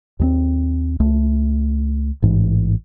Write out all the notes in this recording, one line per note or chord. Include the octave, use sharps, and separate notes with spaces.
D#2 G3 C4
C#2 A3
A1 G#2 E3